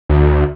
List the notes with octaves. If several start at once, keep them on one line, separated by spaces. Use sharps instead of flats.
D2